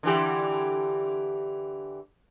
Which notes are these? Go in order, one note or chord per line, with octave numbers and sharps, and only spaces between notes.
D3 E3 G4